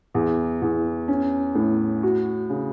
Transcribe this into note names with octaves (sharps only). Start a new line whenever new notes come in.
E2
E2
C#4
A2
F#4
C#3